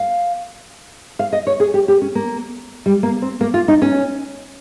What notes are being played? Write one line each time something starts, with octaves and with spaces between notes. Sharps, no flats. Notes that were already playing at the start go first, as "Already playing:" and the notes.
Already playing: F5
F5
D#5
C#5
G#4
G4
G4
C#4
A#3
G3
A#3
C4
A#3
F4
D#4
C#4